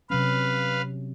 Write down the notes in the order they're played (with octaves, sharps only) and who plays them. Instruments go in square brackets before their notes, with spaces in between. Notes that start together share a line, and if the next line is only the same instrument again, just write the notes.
[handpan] C3 F#3 C#4 [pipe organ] B4 F5